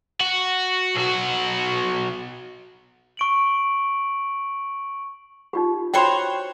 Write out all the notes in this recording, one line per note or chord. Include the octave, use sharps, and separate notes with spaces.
F#4
B1 F#4
C#6 D7 F#7
D#4 F4 G4
F#4 C5 C#5 G5 B5 C6